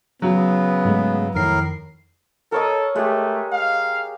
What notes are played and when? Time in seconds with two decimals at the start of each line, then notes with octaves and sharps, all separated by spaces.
0.22 C#3 F#3 B3
0.85 G#2 G#3 A3
1.35 F2 A2 D#3 A#4 C7
2.52 A4 A#4 C#5 D#5
2.96 G#3 A3 G4
3.52 F5